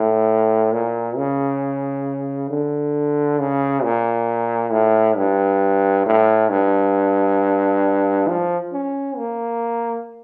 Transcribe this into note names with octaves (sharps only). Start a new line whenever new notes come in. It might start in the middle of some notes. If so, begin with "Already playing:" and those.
Already playing: A2
A#2
C#3
D3
C#3
A#2
A2
G2
A2
G2
F3
C#4
A#3